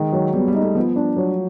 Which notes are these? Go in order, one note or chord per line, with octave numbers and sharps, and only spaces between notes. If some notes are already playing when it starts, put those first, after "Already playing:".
Already playing: D#3 G#3
F#3
G3 B3
G3
D#4
A3
F3 B3
D4
F#3